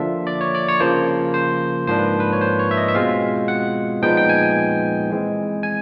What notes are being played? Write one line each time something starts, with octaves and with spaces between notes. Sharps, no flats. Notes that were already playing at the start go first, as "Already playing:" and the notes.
Already playing: D3 F3 A#3 D4 F4 E5
D5
C#5
D5
C#5
C#3 F3 A#3 C5
C5
G#2 F3 A#3 D4 F4 C5
B4
B4
C#5
C5
C#5
E5
D#5
E5
B2 G#3 C4 F4 F5
F#5
A#2 F3 G#3 B3 D#4 G5
G5
G#5
E3 G#3 C4
G#5